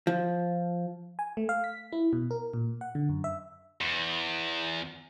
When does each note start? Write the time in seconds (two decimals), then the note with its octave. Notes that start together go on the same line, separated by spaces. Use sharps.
0.07 F3
1.19 G#5
1.37 A3
1.49 F5
1.64 B6
1.92 E4
2.13 B2
2.31 A#4
2.54 A#2
2.81 F#5
2.95 D3
3.09 F#2
3.24 E5
3.81 E2